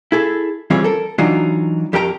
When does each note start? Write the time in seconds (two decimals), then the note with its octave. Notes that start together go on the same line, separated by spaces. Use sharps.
0.12 E4 G#4 A4
0.70 E3 G3 C4 C#4 F4 G#4
0.84 A4 A#4
1.18 E3 F#3 D4 D#4 F4 F#4
1.93 F2 G4 A#4 G5 A#5